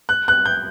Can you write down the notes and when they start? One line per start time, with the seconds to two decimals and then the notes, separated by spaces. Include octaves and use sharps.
0.09 F#6
0.28 F#6
0.46 G6